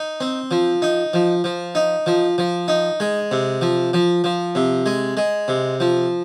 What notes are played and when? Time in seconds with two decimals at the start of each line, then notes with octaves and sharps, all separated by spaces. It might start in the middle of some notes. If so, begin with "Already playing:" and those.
Already playing: D#4
0.20 C4
0.51 F3
0.82 D#4
1.13 F3
1.44 F3
1.75 D#4
2.06 F3
2.38 F3
2.68 D#4
3.00 G#3
3.31 C3
3.61 F3
3.93 F3
4.24 F3
4.55 C3
4.86 G#3
5.17 G#3
5.48 C3
5.80 F3